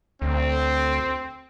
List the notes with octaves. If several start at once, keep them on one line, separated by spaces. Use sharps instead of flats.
D2 C4